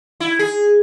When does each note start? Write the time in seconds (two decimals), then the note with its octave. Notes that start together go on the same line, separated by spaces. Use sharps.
0.20 E4
0.39 G#4